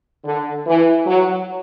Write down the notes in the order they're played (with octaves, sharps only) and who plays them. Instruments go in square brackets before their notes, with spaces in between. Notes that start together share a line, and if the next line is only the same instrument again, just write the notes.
[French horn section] D3
E3
F#3